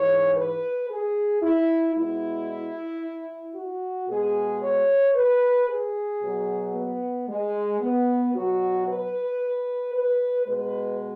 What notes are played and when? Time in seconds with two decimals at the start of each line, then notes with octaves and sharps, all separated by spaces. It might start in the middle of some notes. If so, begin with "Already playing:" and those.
Already playing: G#2 E3 G#3 C#5
0.36 B4
0.89 G#4
1.42 E4
1.95 B2 G#3 E4
3.55 F#4
4.08 B2 G#3 G#4
4.62 C#5
5.15 B4
5.68 G#4
6.21 B2 F#3
6.74 B3
7.28 G#3
7.80 B3
8.34 B2 F#3 F#4
8.87 B4
9.94 B4
10.47 B2 G#3 B4